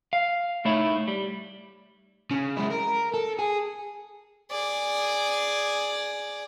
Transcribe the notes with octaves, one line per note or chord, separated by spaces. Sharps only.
F5
A3 D#4 E4 C#5
G3
C#3
G#3 E4
A#4
A4
G#4
G#4 D5